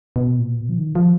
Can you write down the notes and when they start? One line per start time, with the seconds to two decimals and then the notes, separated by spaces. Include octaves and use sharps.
0.16 B2
0.39 A#2
0.61 B2
0.69 F3
0.78 D#3
0.95 F3